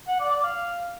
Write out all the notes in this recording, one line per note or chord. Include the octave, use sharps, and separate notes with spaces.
F#5
D5
D5
F5